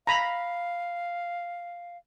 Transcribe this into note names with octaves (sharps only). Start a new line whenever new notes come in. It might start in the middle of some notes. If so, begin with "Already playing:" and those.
F5 A#5 B5